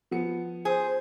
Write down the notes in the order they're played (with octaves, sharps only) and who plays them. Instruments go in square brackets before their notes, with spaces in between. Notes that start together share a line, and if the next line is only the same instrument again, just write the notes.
[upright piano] F3 B3 C#7
[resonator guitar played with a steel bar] G#4 [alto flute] C5